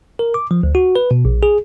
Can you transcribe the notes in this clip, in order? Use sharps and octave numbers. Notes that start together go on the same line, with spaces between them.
A#4
D6
F3
D2
F#4
B4
B2
A#1
G#4